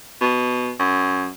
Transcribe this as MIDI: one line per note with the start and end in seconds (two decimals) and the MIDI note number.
0.21 0.72 47
0.80 1.29 42